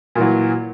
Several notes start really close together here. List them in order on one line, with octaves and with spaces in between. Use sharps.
A#2 E3 F#3